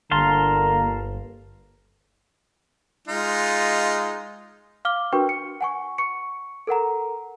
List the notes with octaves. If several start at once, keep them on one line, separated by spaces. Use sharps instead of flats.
G1 D3 A#3 F5 A5 A#5 C6
G#3 D#4 F4
F5 D6 F6 G7
D4 F#4 A#4 B4 G5 C#6
C#7
F#5 G#5 C#6
C#6 C#7
A4 A#4 F#5 A#5